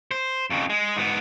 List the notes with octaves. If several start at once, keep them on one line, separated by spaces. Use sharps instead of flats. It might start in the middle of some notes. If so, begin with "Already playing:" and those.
C5
F2 C#3
G#3
G#2 B3